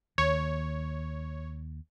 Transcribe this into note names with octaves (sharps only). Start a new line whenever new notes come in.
D#2 C#5